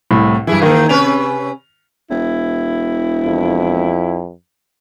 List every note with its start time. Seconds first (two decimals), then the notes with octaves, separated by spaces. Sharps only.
0.11 C2 A2
0.47 G2 E3 E4 G#4
0.62 D#3 E3 A#3 D#4
0.89 C3 C#4 B4 F7
2.10 E1 E4
3.26 F2